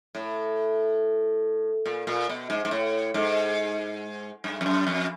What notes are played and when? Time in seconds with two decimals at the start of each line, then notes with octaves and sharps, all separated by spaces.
0.15 A2
1.86 A#2
2.07 A#2
2.29 B2
2.50 G#2
2.65 G#2
2.71 A2
3.14 G#2
4.44 G2
4.61 F2
4.66 F#2
4.87 F2